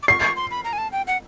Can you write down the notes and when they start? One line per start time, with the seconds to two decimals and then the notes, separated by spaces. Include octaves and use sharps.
0.03 D6
0.08 C#6 C7
0.22 C#6
0.36 C6
0.51 B5
0.64 A#5
0.73 G#5
0.78 A5
0.92 G5
1.07 F#5